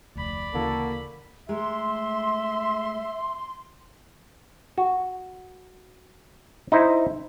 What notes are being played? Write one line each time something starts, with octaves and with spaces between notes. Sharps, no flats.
F1 D2 D5 B5
D2 C#3 E3 A#3 F#4 A4
G#3 A3 A#4 E5 C6
F#4
D#4 E4 C5